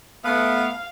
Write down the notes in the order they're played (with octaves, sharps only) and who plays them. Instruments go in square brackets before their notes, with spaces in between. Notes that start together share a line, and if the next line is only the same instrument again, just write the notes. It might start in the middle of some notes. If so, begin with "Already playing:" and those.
[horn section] A3 B3 [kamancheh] F5